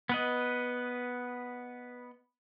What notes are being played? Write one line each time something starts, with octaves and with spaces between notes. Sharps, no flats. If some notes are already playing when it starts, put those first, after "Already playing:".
B3 B4 D#5